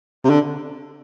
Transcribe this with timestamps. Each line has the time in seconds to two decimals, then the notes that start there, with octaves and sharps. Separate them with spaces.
0.24 C3
0.29 D3